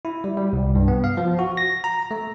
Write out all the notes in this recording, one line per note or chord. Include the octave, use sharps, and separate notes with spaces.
E4
G3
G3
C2
G2
B3
F5
F3
F#4
A#6
A#5
A3